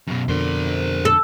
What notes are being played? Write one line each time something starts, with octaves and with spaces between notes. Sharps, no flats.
F#2 B2
F2 B2 D3 A#4 C5
A4